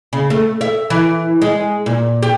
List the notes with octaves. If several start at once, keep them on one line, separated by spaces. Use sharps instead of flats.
C#3
A3
E5
E3
G#3
A#2
G4